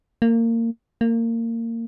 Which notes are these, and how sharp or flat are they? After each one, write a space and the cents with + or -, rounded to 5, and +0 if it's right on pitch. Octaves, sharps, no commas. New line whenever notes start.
A#3 -25
A#3 -25